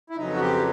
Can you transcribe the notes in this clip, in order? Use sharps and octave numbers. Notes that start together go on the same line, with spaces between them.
E4
F2 C#3 F#3 B3 D#4
F#4
G4